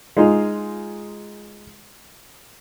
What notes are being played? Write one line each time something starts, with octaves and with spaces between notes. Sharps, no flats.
G#3 D#4 F4